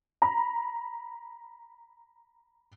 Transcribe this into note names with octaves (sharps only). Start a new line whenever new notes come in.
A#5 B5